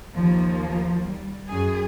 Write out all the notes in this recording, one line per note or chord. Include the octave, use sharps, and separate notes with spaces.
D#2 F3 A#3
G3
F#2 G#4